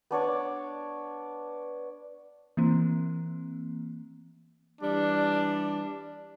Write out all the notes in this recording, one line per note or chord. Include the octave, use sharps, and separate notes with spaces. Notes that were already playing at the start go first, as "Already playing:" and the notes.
B3 D4 C#5 D5
E3 A#3 C4
E3 G3 D4